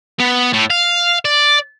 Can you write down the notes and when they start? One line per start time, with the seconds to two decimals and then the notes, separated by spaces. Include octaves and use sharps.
0.20 B3
0.54 A2
0.70 F5
1.25 D5